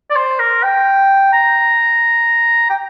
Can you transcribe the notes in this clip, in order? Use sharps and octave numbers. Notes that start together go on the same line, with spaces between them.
D5
C5
A#4
G5
A#5
G5